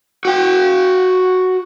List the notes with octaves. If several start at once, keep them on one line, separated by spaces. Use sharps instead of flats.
F#4 G5